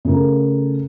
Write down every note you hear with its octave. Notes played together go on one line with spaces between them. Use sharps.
C#3 A3 A#4